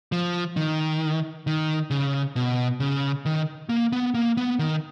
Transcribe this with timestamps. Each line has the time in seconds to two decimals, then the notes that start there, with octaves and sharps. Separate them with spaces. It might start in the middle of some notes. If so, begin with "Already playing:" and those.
0.12 F3
0.57 D#3
1.47 D#3
1.90 C#3
2.36 B2
2.80 C#3
3.26 D#3
3.69 A#3
3.93 B3
4.15 A#3
4.37 B3
4.59 D#3